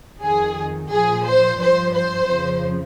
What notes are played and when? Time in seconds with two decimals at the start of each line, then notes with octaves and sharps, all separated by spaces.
0.23 F2 D#3 G#4
0.92 A#2 F3 G#4
1.26 C5
1.60 G2 F3 C5
1.94 C5
2.29 F2 C#3 F3